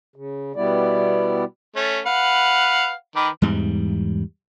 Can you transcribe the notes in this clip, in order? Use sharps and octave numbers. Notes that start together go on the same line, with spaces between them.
C#3
B2 G3 B3 E4 D5
A3 C#4
B4 F5 F#5
D#3 B4 D6
E2 G#2 G3